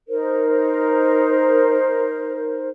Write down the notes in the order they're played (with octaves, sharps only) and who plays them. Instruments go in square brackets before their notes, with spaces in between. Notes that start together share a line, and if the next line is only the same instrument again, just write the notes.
[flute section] D#4 A#4 C5